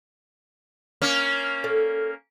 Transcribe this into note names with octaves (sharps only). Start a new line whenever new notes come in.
A#3 C#4
A4 D5